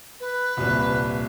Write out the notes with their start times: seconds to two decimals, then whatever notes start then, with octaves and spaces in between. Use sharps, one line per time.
0.20 B4
0.57 D#1 C2